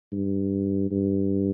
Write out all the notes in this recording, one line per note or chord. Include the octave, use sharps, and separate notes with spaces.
G2
G2